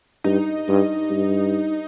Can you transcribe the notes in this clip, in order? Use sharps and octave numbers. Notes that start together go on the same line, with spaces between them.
G2 D#4
G2
G2